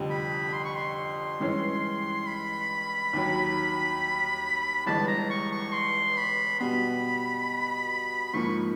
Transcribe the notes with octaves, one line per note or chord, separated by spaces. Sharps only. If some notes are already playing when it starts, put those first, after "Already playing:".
Already playing: F1 F2 D3 G3
B5
C6
C#6
C6
G2 E3 G#3 C#4
B5
D#2 D#3 F#3
G1 G2 E3 G#3 A5
A#5
C#6
C#6
C6
B5
B2 G3 B3 B5
G#2 F3 A#3 C#6